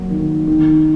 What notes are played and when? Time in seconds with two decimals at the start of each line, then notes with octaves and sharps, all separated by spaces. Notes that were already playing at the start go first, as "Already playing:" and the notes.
Already playing: F#3 A#3
0.10 D#3
0.47 D#3